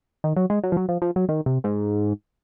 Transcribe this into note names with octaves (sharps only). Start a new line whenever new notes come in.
D#3
F#3
G#3
F#3
F3
F#3
F3
F3
F#3
D#3
C3
G#2